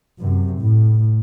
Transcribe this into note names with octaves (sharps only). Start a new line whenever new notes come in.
F#2 C3
A2